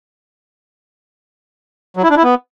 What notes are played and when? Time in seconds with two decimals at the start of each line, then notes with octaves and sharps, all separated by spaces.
1.97 F#3
2.03 E4
2.10 D4
2.17 E4
2.23 B3